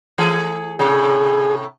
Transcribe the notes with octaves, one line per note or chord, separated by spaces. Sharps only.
E3 A3 G#4
A2 C3 G#4 C#5